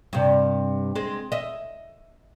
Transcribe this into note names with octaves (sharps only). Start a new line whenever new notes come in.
G2 C3
G#3 C4
D#5 E5